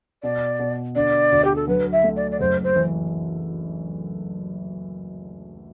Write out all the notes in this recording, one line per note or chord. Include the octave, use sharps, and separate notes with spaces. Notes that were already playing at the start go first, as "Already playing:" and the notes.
B2 D5
B2
D3 D5
D2
G4
A4
F#3 B4
E5
A3
D5
D5
F#1 C5
C5
E3